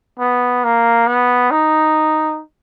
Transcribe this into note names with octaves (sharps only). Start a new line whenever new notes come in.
B3
A#3
B3
D#4